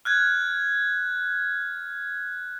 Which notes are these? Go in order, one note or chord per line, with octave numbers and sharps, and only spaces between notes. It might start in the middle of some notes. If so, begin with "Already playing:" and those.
F6 F#6 G#6